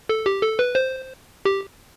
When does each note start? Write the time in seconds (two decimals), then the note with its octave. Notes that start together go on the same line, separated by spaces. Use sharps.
0.09 A4
0.26 G4
0.43 A4
0.59 B4
0.75 C5
1.45 G4